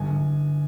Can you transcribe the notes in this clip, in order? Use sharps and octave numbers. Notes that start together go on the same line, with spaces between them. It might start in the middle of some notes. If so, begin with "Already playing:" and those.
Already playing: G1 G#5
G1